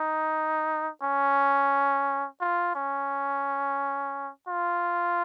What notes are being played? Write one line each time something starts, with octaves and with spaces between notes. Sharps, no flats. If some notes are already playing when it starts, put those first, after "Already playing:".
Already playing: D#4
C#4
F4
C#4
F4